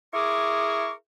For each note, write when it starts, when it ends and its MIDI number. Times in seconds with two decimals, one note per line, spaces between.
0.13 0.91 64
0.13 0.91 68
0.13 0.91 70
0.13 0.91 85
0.13 0.91 86